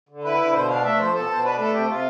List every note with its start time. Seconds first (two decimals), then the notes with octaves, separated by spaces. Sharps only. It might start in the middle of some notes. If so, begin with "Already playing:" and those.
0.09 D3
0.24 E4 B4
0.38 D3
0.53 B2 C5
0.68 D4 F5
0.83 A3 E5
0.98 F3 C5
1.13 B2 A4
1.29 B2 C5
1.43 D4 B4
1.58 A3 A4
1.73 C3 G4
1.88 C3 F4